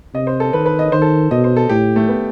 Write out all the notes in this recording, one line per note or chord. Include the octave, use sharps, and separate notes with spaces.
C3 D#5
C5
A4
D#3 B4
B4
D#5
D#3 C5
A4
B2 D#5
C5
A4
A2 G4
A3
B3